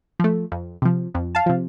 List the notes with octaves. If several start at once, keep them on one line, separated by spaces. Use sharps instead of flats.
F3 A3
F2
C3 F3
F2
F5 A5
C3 F3